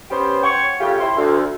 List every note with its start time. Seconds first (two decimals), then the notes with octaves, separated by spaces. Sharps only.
0.11 B3 C#4 G4 C5
0.44 C#5 F#5 G5 C#6
0.81 C#3 A3 F4 G4
1.01 E4 C6
1.18 D2